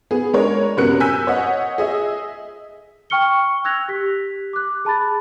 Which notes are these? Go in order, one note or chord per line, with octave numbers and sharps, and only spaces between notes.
B3 G#4
G#3 D4 A#4 C#5
F#2 C3 B3 A#4 F#6 C#7
G#5 E6 G6 B6
C#5 D#5 F#5
G#4 D#5 E5
G5 C#6 F6 C#7 G7
E6 F#6 G#6 A#6 F7
G4 B6
D6 F#6
G#4 A5 B5 A6